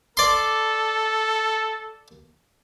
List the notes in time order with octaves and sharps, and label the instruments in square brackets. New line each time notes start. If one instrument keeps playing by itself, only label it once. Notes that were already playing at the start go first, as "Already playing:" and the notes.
[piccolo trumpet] A4 [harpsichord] D5 C6